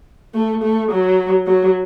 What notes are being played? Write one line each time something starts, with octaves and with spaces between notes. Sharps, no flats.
A3
A3
F#3
F#3